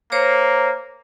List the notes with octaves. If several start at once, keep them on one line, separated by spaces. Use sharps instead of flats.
A#3 C5 C#5 A#5